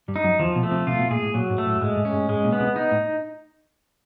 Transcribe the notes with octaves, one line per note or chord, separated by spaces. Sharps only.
G2 G3
D#4
F#2 F#3
E2 E3 F3
B1 B2
A3
C2 C3
C2 C3 F4
B1 B2
A#2 G#4
A2
A#2 F#3
G#2
A3
A2
G2
G#2 G#3
G#2
C#4
G2
G#2 G#3
A#2
B3
C2 C3
D#4
A2